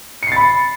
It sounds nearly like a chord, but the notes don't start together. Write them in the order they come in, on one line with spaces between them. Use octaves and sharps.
C#7 C7 A6 B5